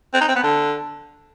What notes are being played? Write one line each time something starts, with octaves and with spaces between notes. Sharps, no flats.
C4
D#4
C4
B3
D3